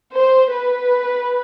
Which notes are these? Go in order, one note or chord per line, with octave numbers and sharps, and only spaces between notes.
C5
B4